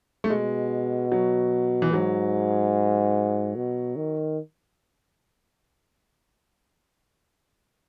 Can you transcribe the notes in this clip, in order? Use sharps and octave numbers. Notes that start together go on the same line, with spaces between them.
A3
B2 G#3
F#3
E3
G#2 F#3
B2
D#3